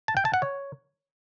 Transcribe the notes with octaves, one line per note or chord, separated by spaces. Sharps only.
A5
G5
A5
F#5
C#5